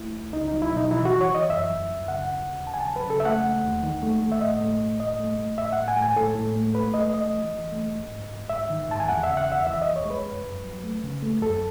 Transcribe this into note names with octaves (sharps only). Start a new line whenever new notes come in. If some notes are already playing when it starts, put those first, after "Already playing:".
Already playing: A3 E4
C#2
C#2 D#4
F#3 D#4
E4
B2 D#4
E3 E4
F#4
E3
C#5
E3 D#5
F#2 E5
F#2
F#2
C#3 F#5
D#2
D#2
C#3 A5
G#5
A5
F#3
B4
C#3 A4
E5
A3 F#5
A3
D#2
D#3
A3
A3
E5
A2 D#5
A3
A2
A2 D#5
A3
A3
A2 E5
A2 F#5
G#5
A2
G#5
A2 A4
A2
A3
A3 B4
A3 D#5
A3 D#5
E3
E3
A3
G#2
G#2
G#2
G#2 E5
D#3
G#2 A5
G#5
E2 F#5
E5
C#3
F#5
E2 E5
E3 E5
E2 D#5
C#5
G#3 B4
F#2
F#2
F#3
A3
C#3
A3
F#2 A4